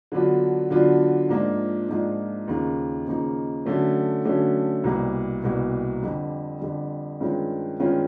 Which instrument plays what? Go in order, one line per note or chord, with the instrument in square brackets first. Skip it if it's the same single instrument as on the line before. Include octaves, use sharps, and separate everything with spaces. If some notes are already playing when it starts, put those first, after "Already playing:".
[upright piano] D3 F#3 B3 D4 F4
D3 F#3 B3 D4 F4
G#2 F3 A#3 D4 F4
G#2 F3 A#3 D4 F4
D#2 C#3 F3 A#3 D#4
D#2 C#3 F3 A#3 D#4
D3 F#3 A3 C#4
D3 F#3 A3 C#4
C2 B2 G3 A#3
C2 B2 G3 A#3
F2 D3 G3
F2 D3 G3
G2 D#3 G#3 C#4 F4
G2 D#3 G#3 C#4 F4